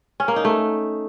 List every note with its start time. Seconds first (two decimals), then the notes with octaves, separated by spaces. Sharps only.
0.20 C#4
0.28 A#3
0.36 D#4
0.45 A3